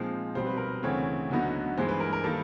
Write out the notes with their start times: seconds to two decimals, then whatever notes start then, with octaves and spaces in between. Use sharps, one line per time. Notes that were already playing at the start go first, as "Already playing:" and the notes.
Already playing: A#2 F3 G#3 C4 D#4
0.35 B2 G3 C4 C5
0.46 B4
0.57 A#4
0.68 B4
0.83 D2 C#3 E3 A3 C4 C#5
1.30 D2 D3 F#3 B3 D#4
1.78 G2 E3 G#3 C5
1.88 B4
2.00 A#4
2.13 A#4
2.24 D#3 G3 A#3 A4